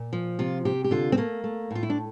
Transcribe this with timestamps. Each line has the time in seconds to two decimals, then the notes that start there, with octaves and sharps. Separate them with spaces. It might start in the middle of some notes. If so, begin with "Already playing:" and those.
Already playing: A#2
0.13 F3
0.39 C3 F4
0.65 C3 G4
0.84 G4
0.91 D3 F4
1.12 C4
1.17 A3 A#3
1.44 A3
1.71 A2 F4
1.83 E4
1.90 D4